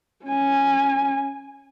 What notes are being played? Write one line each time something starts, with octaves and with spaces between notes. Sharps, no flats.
C#4 G#5